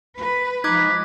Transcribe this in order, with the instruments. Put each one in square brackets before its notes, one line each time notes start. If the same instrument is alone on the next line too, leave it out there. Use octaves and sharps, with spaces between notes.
[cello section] B4
[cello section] F3 G#3 [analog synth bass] D#4 [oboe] B5 [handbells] D6 F#6 G#6